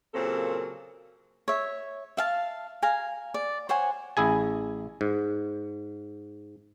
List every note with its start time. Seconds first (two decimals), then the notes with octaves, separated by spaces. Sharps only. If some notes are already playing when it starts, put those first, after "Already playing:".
0.14 A#2 C#3 F#3 A#3 C4 A4
1.48 C#5 E5
2.17 E5 F5 A5
2.82 F5 G#5 A#5
3.34 D5
3.69 C5 C#5 F#5 G#5
4.17 A1 E4 G#4 G#5
5.01 G#2